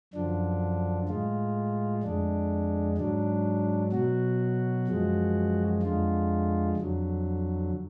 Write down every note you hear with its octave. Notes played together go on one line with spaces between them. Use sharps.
F#2 D3 F3 D4
A2 G#3 F4
F2 D3 G#3 D4
G#2 F#3 D4
B2 F#3 F#4
F#2 F3 G#3
F2 D3 G#3 F4
F2 D3 F#3